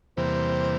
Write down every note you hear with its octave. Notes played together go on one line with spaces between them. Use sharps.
E2 C3 E3 G3 A#3 C5